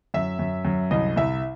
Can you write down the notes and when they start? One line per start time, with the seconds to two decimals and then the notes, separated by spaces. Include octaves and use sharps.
0.14 F#2 E5
0.39 F#2
0.65 F#2
0.91 C2 D#5
1.16 C2 E5